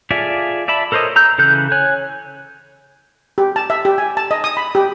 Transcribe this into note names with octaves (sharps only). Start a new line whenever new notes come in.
F4 G#4 A4 D5 E5
D5 E5 A5 B5
A4 A#4 C5 C#5 D#5
A#5 E6 G6
C#3 E3 A4 F#6 G6
C#5 G#5 F#6
G4
A5
E5
G4
G#5
A5
D#5
D#6
B5
G4